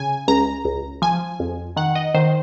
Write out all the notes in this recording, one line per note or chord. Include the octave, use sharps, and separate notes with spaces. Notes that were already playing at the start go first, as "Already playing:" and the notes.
Already playing: C#3 G#5
C#2 A#5
C#2
F3 G#5
F2
D#3 F#5
D#5
D#3 C5